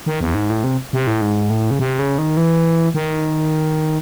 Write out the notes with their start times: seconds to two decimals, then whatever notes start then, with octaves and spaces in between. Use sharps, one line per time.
0.06 D#3
0.20 E2
0.35 G#2
0.50 A2
0.64 C3
0.93 C3
1.07 A2
1.21 G#2
1.50 A2
1.71 C#3
1.79 C3
1.99 C#3
2.18 D#3
2.37 E3
2.94 D#3